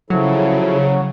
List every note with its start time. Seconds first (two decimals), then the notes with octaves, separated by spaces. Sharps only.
0.10 C#3 F3 F#3 E4 A4